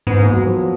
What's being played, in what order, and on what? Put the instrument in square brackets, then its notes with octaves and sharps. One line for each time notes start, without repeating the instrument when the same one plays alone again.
[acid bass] G#2 [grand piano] B3
[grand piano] A#3
F#3
F3